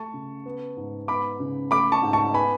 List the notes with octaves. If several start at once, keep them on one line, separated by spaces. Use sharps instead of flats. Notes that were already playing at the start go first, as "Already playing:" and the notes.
Already playing: A3 A5 C#6
C#3
B3
G#2
B3 B5 D6
C#3
A3 B5 D6
A5 C#6
G#2
A5 C#6
B3 G#5 B5